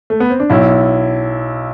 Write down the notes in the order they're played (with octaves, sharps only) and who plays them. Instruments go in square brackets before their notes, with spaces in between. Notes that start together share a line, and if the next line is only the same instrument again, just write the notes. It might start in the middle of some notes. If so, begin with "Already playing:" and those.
[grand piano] A3
B3
C4
D4
[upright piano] B1 [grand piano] E4